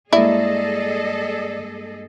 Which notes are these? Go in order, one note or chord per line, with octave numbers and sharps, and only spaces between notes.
G2 G#3 A#3 E4 G#4 A4 D5 D#5